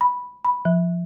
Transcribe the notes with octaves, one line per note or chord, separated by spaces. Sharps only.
B5
B5
F3